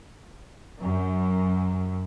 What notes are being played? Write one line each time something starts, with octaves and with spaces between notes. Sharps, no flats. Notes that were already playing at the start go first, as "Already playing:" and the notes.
F#2